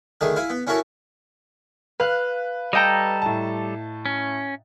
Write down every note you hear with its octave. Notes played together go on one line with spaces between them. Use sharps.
D3 D#3 A3 G#4
E4 F5 G#5
B3
C#4 E4 F#4 A4 A#4 C#5
B4 F5 F#6
G3 A4 D#5 G5 A#5
A2 A5
C#4